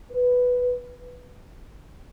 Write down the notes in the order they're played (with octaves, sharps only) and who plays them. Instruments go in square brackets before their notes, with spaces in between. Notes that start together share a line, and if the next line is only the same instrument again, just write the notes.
[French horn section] B4